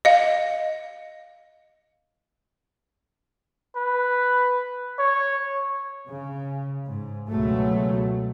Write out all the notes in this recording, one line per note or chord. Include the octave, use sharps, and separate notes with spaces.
D#5 F5
B4
C#5
C#3
G#2
C#2 B2 F#3 G#3 A3